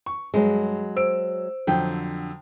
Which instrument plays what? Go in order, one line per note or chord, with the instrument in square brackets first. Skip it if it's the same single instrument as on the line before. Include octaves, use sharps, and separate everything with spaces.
[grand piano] C#6
[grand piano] G2 [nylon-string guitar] F#3 G#3
[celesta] C5 [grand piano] E6 D7
[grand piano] F2 D3 F#3 [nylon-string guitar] G5